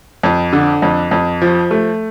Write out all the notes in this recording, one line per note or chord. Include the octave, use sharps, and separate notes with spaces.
F2
D3
F2
F2
F3
A3